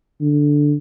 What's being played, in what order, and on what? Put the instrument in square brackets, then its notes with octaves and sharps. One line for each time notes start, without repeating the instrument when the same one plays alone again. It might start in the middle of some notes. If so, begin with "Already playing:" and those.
[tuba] D3